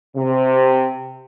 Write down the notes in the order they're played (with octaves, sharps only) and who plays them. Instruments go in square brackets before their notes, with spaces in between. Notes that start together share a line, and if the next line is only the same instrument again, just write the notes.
[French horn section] C3